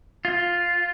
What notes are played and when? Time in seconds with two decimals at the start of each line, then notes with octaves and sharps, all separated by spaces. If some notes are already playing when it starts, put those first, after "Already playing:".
0.25 F4